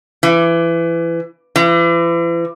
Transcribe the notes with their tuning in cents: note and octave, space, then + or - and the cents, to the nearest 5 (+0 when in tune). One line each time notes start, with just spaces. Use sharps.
E3 +25
E3 +40